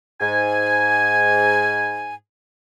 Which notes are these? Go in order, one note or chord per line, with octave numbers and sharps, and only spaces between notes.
G#2 G#5